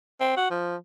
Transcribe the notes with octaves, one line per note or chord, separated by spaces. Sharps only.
C4
F#4
F3